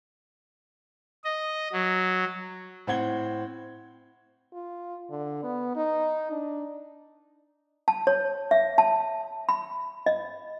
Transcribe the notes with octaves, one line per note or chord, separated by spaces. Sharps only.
D#5
F#3
A2 C4 F#5 G#6 G7
F4
D3
B3
D#4
D4
A5
C#5
E5
A5
B5
D#5